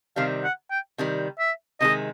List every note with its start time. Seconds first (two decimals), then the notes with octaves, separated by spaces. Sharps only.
0.16 C3 D#3 G3 F5
0.44 F#5
0.71 G5
0.98 C3 D#3 G3
1.39 E5
1.81 C3 D#3 G#3 D#5